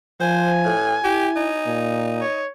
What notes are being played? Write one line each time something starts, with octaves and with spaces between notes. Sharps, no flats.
F3 C5 G#5
A2
E4 G4
D#4
A#2
C#5